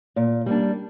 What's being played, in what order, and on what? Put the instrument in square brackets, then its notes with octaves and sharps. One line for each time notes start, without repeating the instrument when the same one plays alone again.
[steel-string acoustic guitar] A#2
G3 A#3 D4